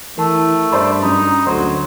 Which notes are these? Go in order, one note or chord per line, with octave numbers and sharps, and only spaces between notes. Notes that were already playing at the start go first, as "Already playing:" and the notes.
E3 A3 A#4 A5
G2 C5 D5 B5
F#2 D#4 B5
D2 F#3 C5 C6